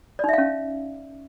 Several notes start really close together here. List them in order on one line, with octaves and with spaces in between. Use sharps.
D5 D#4 E5 F5 C#4